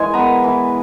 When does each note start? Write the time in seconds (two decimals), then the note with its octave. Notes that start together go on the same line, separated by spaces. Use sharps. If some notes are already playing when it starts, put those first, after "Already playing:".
Already playing: E3 G#3 G#5
0.14 B3 A#5
0.44 E3